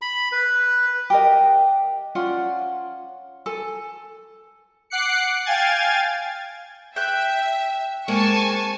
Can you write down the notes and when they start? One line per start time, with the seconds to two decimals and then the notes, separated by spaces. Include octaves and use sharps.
0.02 B5
0.32 B4
1.10 G4 A#4 D#5
2.15 C#4 F4 D5 F#5
3.46 A4 G#5
4.90 F#5 D6 F#6 C7 C#7
5.45 F5 G5 G#5 G#6 A6
6.96 E5 G5 F#6
8.08 G#3 A#3 C4 G#5 A5 C#6